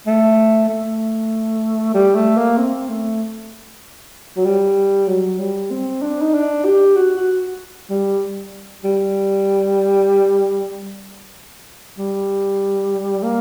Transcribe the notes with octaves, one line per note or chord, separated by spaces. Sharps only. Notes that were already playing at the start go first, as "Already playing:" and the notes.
A3
A3
G3
A3
A#3
C4
A3
F#3
G3
F#3
G3
C4
D4
D#4
D4
G4
F#4
F#4
G3
G3
G3
A#3